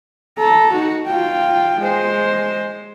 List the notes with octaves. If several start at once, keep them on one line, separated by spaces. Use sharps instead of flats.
A4 A#5
D#4 F#4
F4 G5
G#3 C5